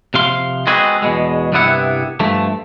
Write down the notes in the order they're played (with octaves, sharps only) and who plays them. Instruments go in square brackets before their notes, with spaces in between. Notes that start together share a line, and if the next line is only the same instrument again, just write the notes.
[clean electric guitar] C3 F3 F5 C6
G#3 B3 C4 F#4 G#4
E2 B2 G#3
C2 G2 C3 B3 E4 F#5
G2 F3 A3